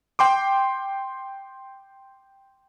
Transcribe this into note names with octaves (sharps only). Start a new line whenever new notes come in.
G5 C6 D6